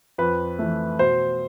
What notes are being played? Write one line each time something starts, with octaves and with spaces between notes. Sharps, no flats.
F2 B4
E3 A3
B2 C5